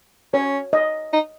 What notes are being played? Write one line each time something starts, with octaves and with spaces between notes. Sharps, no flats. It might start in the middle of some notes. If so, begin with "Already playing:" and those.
C#4 C#5
D#5
D#4